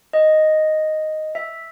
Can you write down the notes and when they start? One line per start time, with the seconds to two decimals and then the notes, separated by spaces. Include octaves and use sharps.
0.13 D#5
1.35 E5